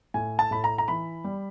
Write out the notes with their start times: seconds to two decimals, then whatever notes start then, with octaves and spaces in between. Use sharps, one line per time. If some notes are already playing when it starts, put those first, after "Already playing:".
0.14 A2 G#5
0.39 A5
0.51 A2 B5
0.64 A#5
0.78 A#5
0.88 E3 B5
1.24 G3